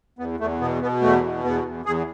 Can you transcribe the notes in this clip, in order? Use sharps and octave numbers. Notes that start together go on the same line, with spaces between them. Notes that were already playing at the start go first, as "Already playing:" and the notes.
E2 B3
E2 A3
B2 B3
B2 B3
E2 A3
B2
E2 B3
E2
E2 G#4